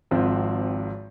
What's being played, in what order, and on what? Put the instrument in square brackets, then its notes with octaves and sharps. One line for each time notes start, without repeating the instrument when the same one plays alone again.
[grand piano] G#1 G#2 F3 C4